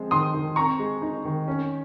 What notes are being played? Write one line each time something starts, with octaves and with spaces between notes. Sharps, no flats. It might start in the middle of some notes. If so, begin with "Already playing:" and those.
Already playing: F3 G#3 C4
D#3 C6 D#6
D#3
C4 A#5 C#6
G#3
D#4
D#3
C#4